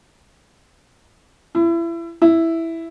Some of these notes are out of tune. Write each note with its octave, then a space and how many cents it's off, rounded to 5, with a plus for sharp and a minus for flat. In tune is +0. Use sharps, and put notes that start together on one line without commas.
E4 +30
E4 +0